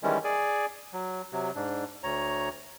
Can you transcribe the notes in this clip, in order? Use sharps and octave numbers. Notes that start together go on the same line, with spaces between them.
D#3 E3 G3 G#3 C#4 E4
G#4 D5 G#5
F#3
C3 F#3
G#2 D4
D2 C#5 A#5